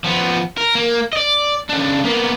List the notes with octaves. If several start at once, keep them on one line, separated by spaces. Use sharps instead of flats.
F3 B3
A#4
A#3
D5 D#5
C#3 D4
A#3 B3